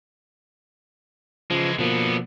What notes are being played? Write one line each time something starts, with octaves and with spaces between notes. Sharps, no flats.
C#3 E3 F3 G#3
B2 D3 F3 A#3 B3